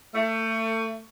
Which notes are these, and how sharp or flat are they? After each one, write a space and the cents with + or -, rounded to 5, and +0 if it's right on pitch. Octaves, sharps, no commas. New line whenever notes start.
A3 +30